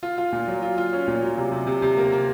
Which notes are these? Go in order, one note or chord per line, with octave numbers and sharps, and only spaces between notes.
F4
F4
A#2
F#3
F4
F4
C#4
A#2
F#3
C3
C3
C3
C3
A#3
A#3